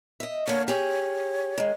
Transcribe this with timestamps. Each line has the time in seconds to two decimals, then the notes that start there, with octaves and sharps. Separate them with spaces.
0.20 D#5 E5
0.47 D3 A#3 C#5
0.68 G4 G#4 C#5
1.58 D#3 G#3